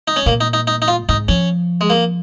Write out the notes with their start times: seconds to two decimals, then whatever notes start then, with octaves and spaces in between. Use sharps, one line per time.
0.08 D#4
0.16 C#4
0.26 A#2 A#3
0.41 D#4
0.53 D#4
0.67 D#4
0.82 D#4
0.88 F4
1.09 G#2 D#4
1.28 F3 C#4
1.81 G#3
1.90 A#3